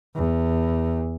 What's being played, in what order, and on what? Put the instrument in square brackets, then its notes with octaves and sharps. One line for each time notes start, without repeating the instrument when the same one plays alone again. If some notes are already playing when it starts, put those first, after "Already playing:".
[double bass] E2